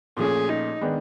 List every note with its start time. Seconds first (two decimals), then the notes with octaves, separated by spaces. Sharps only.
0.17 A#2 F3 A3 C#4 G#4
0.49 D#4
0.81 D#3 G#3 B3 D4